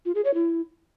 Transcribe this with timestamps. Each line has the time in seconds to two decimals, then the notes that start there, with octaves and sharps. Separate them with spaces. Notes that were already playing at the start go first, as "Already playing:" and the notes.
0.05 F4
0.15 G#4
0.25 C#5
0.34 E4